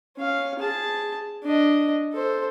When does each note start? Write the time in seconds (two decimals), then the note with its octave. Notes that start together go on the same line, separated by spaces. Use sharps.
0.17 C#4 F5
0.59 G#4 A5
1.44 D4 D#5
2.14 A4 C5